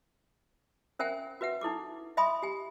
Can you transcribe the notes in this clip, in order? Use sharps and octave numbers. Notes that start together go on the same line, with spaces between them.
C#4 A#4 C5 E5 F#5 G#5
F#4 B4 E5 F#5
D#4 E4 A4 D6
D#5 E5 G#5 B5 C6 D#6
G4 G#5